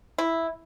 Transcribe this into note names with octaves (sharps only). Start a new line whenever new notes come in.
E4